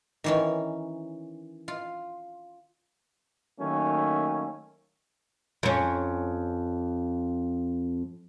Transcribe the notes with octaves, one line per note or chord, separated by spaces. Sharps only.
D#3 E3 C#4
F4
D#3 F#3 A3 A#3 C#4
F2 C#4